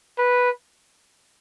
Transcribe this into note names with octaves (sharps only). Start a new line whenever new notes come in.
B4